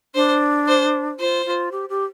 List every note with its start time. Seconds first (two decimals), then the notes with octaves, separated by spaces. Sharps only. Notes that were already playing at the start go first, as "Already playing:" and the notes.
0.15 D4 C5
0.68 C5
1.19 F4 C5
1.46 F4
1.72 G4
1.89 G4